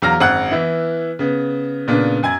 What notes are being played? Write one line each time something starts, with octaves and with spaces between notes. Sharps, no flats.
E2 F#3 F5 A#5 F6 A#6
G#1 F#2 F#5 F#6
E3 B3 E4
C#3 B3
A#2 C#3 B3 D4
F#2 G#5 G#6